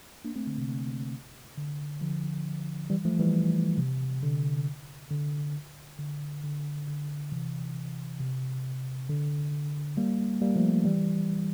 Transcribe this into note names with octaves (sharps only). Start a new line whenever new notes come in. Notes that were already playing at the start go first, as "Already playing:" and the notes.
A#3 D4
A3 C4
D3
C3
D3
D3 F3
E3 G3
F3 A3
E3 G3
C3
D3
D3
D3
D3
D3
C3 E3
C3
D3
G3 A#3
G3 A#3
F3 A3
E3 G3